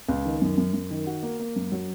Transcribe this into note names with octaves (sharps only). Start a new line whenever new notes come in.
C#2
D#3
F#2
F#2
F#2
D#3
F#4
A#3
A#3
F#2
F#3